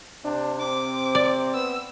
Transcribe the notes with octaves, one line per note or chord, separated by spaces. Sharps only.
C3 D4
C4 D6
D5
B3 E6